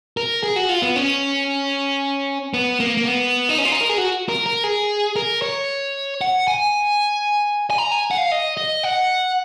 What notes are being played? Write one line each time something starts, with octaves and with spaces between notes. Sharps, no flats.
A#4
G#4
F#4
F4
B3
C#4
B3
A#3
A#3
B3
D#4
C#4
F4
D#4
A#4
G#4
F#4
A#4
A#4
G#4
A#4
C#5
F#5
G#5
G#5
A#5
G#5
F#5
F5
D#5
D#5
F#5